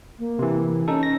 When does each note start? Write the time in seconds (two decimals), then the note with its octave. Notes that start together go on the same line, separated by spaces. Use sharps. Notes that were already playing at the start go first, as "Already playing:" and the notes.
0.19 A#3
0.39 C3 E3
0.88 C#4 D#4 A4
1.03 A#6